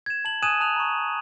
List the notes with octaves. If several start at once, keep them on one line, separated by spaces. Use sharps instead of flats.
G#6 E7
A5 F#7
G#5 D#6 F#6 G#6 D#7 E7
A5 D#6 F#6 G#6 F7
A#5 C#6